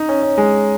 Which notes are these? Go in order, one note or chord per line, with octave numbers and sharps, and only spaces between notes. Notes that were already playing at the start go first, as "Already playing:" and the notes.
Already playing: D#4
C#4
C#4
G#3